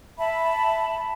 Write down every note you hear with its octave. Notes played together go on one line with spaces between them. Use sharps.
E5 A5 B5